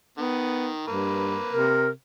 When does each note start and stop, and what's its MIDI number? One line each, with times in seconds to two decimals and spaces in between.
0.18 0.83 51
0.18 0.69 59
0.87 1.37 43
0.87 1.75 58
0.87 1.75 71
1.52 1.90 48
1.52 1.89 70